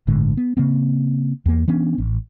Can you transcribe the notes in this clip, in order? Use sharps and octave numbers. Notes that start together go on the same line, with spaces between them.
G1 A2 D3 G#3
B3
C#3 A#3 C4
E2 A#3
E3 B3 C#4 D4
A1